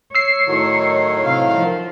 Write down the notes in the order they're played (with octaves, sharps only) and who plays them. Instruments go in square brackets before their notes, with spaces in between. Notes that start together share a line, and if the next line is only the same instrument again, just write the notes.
[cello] C#5 [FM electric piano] E6 C7
[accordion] A2 D#3 F#3
[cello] C3 F5
F3